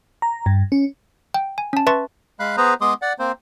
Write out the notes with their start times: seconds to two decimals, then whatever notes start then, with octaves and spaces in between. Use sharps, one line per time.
0.22 A#5
0.46 G2
0.72 C#4
1.34 G5
1.58 G#5
1.73 C#4 A5
1.87 B4 E5 A5 C6 C#6 A6
2.40 G#3 F5 B5 F#6
2.57 B3 G#4 B4 C5 A#5
2.81 G#3 B3 G#4 C6 D6 D#6
3.02 D5 F#5
3.19 A#3 C4 C5